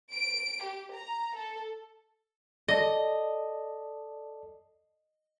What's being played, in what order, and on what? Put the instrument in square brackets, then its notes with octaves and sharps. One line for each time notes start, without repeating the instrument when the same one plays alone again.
[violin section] D7
G4
A#5
A4
[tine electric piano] A4 D5 A5 [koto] D#5